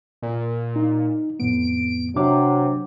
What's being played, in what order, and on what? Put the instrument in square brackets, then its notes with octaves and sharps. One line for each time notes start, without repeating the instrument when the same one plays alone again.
[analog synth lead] A#2
[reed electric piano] D#4
[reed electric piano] F2 A2 B3 [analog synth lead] D7
[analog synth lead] C3 [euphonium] F#3 [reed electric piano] D4 D6